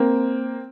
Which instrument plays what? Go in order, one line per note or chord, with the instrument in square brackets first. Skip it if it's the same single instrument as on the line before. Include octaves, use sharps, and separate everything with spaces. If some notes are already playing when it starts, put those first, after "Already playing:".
Already playing: [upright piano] A#3 C4